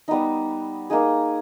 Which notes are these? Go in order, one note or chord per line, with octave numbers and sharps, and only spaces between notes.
G3 B3 D#4
A#3 D#4 G#4